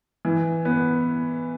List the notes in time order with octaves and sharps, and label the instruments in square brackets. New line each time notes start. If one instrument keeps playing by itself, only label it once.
[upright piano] E3
B3